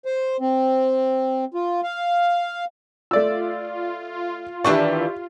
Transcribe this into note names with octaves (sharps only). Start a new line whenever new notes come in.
C5
C4
F4
F5
A3 F4 D5 E6
D#3 E3 D4 E4 G4 D5 C#6